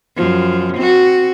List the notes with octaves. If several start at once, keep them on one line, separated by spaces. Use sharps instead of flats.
F#2 F3
C4 F#4